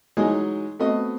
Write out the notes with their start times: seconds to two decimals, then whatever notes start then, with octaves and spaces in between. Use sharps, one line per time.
0.17 E3 F#3 G#3 D#4 D#5 G#5
0.79 A3 B3 C4 F#4 D#5